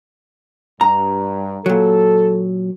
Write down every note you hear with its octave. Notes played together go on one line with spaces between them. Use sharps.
G2 A#5
A#2 F#3 A4